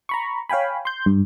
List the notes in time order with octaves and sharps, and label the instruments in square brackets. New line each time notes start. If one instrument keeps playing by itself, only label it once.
[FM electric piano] A#5 B5 C#6
C#5 F5 G5 G#5 B5
C6 G6
G2